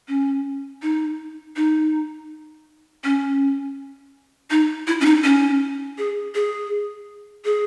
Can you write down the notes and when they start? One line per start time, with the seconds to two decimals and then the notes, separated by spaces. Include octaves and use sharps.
0.08 C#4
0.82 D#4
1.56 D#4
3.04 C#4
4.51 D#4
4.87 E4
5.01 C#4
5.05 D#4
5.24 C#4
5.98 G#4
6.35 G#4
7.45 G#4